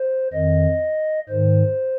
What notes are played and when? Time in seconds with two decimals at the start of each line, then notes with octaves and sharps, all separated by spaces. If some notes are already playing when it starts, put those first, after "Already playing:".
Already playing: C5
0.33 F2 D#3 D#5
1.29 G#2 D#3 C5